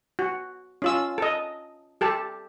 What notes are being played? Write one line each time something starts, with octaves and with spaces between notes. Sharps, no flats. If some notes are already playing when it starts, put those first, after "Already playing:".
F#4
C#4 F4 E6
A4 D#5
G4 A4 A5